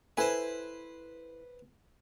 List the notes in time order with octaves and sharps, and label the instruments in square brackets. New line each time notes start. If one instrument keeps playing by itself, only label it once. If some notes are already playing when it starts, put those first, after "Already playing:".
[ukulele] E4 A4 G#5 [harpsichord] B4 C5